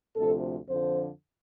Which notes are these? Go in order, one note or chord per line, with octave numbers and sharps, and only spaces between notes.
D2 C3 F3 A4
F2 D3 F3 C5